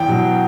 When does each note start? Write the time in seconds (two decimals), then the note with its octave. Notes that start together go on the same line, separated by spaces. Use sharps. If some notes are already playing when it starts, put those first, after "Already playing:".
Already playing: E2 G5
0.08 B2 F#3